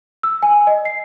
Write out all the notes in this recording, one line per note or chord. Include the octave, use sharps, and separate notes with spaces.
E6
G#5
D#5
C7